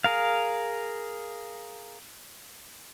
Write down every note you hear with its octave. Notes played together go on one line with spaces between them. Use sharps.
G#4 A#4 F5